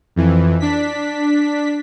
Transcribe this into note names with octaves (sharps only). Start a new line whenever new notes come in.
F2 E3
D4 B6